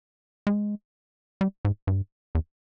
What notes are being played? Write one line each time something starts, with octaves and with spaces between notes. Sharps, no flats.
G#3
G3
G#2
G2
E2